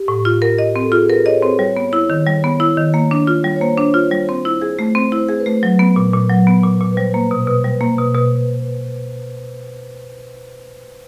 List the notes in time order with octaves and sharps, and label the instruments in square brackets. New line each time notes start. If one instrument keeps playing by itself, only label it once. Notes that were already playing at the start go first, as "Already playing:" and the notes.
Already playing: [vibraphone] G4
[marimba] A2
F4
A#4
D#5
C4
[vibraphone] A4
[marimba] F4 [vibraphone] G#4
[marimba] A#4 [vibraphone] B4
[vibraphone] C#5 [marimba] D#5
[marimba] C4 [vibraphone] C5
[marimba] G3 [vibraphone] C#5
[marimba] B3
E4
D#3
G3
B3
E4
D#3
A#3
D4
F4
G3
[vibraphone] C#5
[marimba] A#3 [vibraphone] C5
[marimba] D4
F4
G3
C4
E4
G#4
A3
[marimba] C4 [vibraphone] C5
[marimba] E4
[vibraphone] C5
[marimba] G#4
[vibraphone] B4
[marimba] A3
F#3
B3
A#2
A#2
F#3
B3
A#2
A#2
[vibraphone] B4
[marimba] G3 [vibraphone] C5
[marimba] A#3
B2
B2
G3
A#3
B2
B2